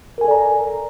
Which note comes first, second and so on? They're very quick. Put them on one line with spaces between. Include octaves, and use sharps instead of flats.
A#4 G#5 A4 D5 A#5